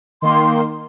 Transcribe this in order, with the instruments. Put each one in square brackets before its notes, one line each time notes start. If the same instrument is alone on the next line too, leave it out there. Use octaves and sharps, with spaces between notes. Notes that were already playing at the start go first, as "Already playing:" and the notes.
[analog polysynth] D#3 A#3 [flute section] C6